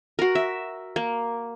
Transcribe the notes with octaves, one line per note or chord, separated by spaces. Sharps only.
F#4 A#4
E5
A#3